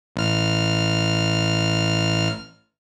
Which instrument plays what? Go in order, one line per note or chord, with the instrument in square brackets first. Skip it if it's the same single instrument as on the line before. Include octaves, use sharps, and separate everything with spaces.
[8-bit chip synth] A1 F6